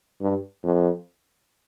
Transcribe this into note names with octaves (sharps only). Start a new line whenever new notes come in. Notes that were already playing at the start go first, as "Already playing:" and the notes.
G2
F2